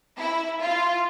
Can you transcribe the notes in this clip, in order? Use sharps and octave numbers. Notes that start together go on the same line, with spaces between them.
E4
F4